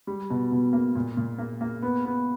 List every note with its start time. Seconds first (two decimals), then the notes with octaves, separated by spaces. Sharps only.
0.07 G3
0.30 B2
0.51 B2
0.73 A#3
0.95 A#2
1.17 A#2
1.39 A#3
1.61 A#3
1.82 B3
2.05 B3